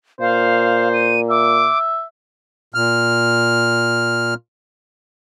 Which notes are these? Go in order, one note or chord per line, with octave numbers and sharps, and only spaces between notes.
A#2 C5 F5
D#7
E5 D6
A#2 F6